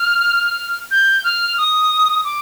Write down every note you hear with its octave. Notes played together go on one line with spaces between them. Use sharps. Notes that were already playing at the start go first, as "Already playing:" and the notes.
Already playing: F6
G6
F6
D#6
D6